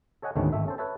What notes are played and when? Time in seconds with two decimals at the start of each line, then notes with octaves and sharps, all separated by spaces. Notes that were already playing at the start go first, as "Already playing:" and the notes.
0.22 A4 C#5 D#5 F#5 G#5
0.36 D2 G#2 B2 D#3 A3 C#4
0.52 G#1 A3 E5
0.66 C#4 A4 C5
0.78 A4 B4 C#5 E5 A5